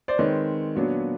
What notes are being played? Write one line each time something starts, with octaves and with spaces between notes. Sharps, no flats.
C5 D5
D#3 G#3 C4 B4 C#5
A#2 F#3 B3 D4